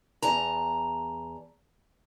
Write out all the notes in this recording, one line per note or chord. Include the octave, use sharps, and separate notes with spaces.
E2 A5 A#5